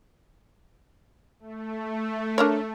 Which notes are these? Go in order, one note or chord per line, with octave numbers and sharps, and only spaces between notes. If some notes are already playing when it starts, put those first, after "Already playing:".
A3
D4 A#4 C#5